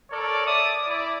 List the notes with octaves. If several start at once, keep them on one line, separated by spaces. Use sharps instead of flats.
A4 A#4 C#5 D5
D5 E5 A5 D6 D#6
E4 D5